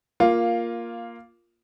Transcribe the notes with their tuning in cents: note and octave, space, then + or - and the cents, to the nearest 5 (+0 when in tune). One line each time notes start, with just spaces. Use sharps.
A#3 +5 F4 +0